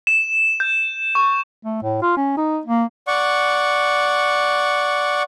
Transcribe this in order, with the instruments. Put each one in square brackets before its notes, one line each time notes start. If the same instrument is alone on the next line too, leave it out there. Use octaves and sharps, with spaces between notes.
[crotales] E7
G6
C#6
[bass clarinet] A3
A2
F4
C#4
D#4
A#3
[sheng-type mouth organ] D5 F#5 C#6